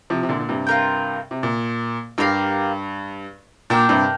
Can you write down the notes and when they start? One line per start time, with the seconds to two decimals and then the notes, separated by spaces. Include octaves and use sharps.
0.10 C3 F3
0.23 C3
0.29 A#2 D3
0.40 A#2
0.49 G2 C3
0.67 F4 A#4 G5
1.31 C3
1.43 A#2
2.18 G2 G4 A#4 F5
3.70 A#2 D4 A#4 G5
3.89 G2 C3